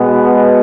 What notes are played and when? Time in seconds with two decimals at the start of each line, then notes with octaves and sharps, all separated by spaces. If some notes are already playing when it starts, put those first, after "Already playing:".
Already playing: B2 G#3 B3